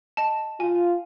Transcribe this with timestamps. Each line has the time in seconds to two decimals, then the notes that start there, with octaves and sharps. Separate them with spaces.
0.17 D#5 A5
0.60 F4 G#5